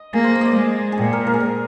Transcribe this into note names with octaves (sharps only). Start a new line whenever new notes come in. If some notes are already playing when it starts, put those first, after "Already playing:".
Already playing: D#5
A#3 G#4
C5
C5
D5 D#5
G#3
G#4
A#2 G4
A#4
A#4
G#4
A#4